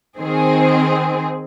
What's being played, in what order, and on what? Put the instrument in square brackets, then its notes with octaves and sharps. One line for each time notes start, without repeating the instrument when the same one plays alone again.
[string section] D#3 C4 G#4